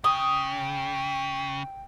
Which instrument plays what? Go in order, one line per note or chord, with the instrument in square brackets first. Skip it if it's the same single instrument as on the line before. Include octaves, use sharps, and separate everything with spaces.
[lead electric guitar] C#3 [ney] G5 [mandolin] D#6